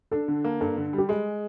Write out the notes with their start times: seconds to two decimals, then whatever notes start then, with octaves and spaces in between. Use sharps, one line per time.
0.11 D4 A4
0.28 D3
0.44 A#3
0.61 G2 A4
0.77 D3
0.93 G3
0.98 G4
1.09 G#3 G#4